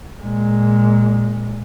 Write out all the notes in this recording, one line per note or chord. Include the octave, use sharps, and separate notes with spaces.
A#2 G#3